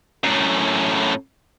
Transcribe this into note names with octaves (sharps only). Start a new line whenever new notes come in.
F#2 A2